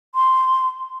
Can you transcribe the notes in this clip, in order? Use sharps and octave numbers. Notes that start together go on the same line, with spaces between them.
C6